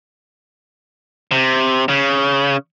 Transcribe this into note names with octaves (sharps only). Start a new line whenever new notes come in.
C3
C#3